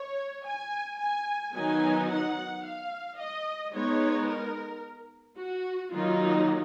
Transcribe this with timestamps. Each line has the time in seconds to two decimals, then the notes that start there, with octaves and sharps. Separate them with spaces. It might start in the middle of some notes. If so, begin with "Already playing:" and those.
Already playing: C#5
0.45 G#5
0.99 G#5
1.54 D#3 F#3 B3 D#4 G#5
2.10 F#5
2.65 F5
3.18 D#5
3.73 G#3 B3 D#4 C#5
4.28 A#4
5.38 F#4
5.92 D#3 F#3 A#3 D#4 F4